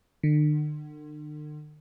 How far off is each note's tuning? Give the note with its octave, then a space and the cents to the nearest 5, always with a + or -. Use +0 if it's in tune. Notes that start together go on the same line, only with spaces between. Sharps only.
D3 +45